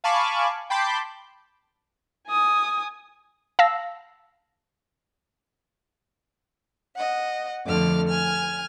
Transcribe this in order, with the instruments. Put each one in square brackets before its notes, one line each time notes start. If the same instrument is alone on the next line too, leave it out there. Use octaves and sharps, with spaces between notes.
[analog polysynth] F5 G#5 A5 B5 C#6 D6
G5 A5 B5 C6 D6 G6
[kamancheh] G#5 D#6
[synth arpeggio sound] F5 A5 E6 A#6
[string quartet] D#5 F#5
F2 D3 A3 D6 F6
G#5 F6